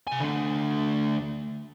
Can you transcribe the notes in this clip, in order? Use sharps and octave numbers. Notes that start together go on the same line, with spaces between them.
C3 G#5
D3 A3